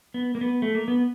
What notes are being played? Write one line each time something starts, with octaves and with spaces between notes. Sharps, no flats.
B3
A#3
B3
A3
A#3
B3